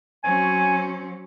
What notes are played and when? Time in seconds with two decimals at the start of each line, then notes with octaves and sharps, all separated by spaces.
0.24 F#3 C4 C#4 G#5